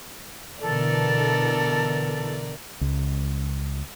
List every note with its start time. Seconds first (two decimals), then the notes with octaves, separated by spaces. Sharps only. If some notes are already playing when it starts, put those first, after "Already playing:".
0.61 B2 D3 E3 A4 A#4 D5
2.81 C#2